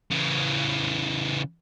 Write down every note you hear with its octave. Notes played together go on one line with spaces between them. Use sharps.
C#3 E3